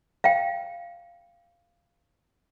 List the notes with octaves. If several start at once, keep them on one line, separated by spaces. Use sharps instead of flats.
F5 G5